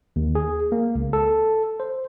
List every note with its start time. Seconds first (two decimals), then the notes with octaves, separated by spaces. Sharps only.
0.16 D#2
0.35 G#4
0.72 A#3
0.95 C#2
1.13 A4
1.80 C5